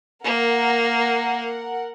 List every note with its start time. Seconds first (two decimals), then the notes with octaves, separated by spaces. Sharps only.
0.24 A#3 A#4 F#5